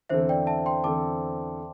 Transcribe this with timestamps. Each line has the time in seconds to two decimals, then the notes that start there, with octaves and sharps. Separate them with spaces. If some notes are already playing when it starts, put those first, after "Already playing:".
0.10 E2 D3 C4 A4 C5 E5
0.29 D5 G5
0.47 E5 A5
0.66 G5 C6
0.84 E2 D3 C4 A4 A5 D6